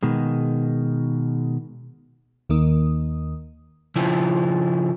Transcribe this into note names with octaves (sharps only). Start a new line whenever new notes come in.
B2 D#3 G#3
D#2 D#3 A#3 D#6
C#3 F3 E4